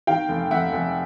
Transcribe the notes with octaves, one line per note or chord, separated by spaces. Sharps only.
D#3 F5 G5
F1
F1 E5 F#5
F1